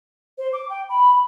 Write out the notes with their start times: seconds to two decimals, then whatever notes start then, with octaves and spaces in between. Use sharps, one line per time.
0.38 C5
0.53 D6
0.69 G5
0.89 B5